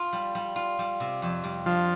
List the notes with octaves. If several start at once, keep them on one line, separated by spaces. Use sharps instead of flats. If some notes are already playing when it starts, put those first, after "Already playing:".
Already playing: F4
G3
G3
F4
G3
C3
F2
G3
F3 D4